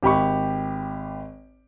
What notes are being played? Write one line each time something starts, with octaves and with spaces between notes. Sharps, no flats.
G#1 G4 B5 C#6